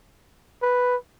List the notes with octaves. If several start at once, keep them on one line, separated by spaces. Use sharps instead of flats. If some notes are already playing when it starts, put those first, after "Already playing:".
B4